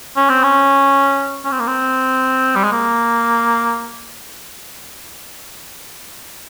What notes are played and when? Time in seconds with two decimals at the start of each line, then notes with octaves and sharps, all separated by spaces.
0.17 C#4
0.30 C4
0.43 C#4
1.45 C#4
1.52 C4
1.60 A#3
1.67 C4
2.55 G3
2.64 G#3
2.72 A#3